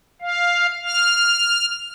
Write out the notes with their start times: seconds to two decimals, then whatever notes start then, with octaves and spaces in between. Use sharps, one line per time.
0.22 F5
0.84 F6